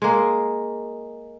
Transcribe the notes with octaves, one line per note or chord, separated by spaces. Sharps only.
G#3 A#3